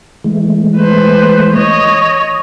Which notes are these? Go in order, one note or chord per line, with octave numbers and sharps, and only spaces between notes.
E3 G#3 A3
B4 C5
C#5 D#5